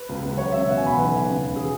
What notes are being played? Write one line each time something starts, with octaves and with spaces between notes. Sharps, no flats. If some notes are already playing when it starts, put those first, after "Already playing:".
Already playing: B4
C#2
C#2
F#3 C#5
C#3 E5
B2 F#5
G#5
E2 B5
B1 B4
B2
C#3
E1
G#4